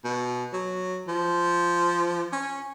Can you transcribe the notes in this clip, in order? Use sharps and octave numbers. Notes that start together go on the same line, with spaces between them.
B2
F#3
F3
C#4